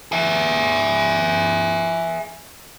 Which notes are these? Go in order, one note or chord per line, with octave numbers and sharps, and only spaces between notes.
G#4 E5